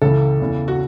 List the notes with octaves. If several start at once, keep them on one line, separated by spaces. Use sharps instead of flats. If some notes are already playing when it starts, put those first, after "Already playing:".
C#2 C#3 E3 A4
E2 C#3 E3
F#4